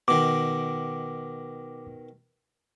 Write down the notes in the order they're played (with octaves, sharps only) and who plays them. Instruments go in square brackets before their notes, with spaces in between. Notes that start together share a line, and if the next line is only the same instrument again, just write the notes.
[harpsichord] B2 D#3 [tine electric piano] D6